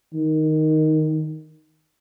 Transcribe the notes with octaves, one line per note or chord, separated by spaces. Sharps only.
D#3